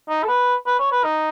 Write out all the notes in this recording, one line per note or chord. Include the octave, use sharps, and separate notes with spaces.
D#4
A4
B4
B4
C#5
B4
D#4